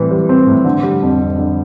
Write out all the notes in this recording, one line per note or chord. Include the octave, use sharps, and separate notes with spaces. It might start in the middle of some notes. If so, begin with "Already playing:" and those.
Already playing: A2 E3 G3 C4
G3
C4
A2
D3
G3
F2
F2
D3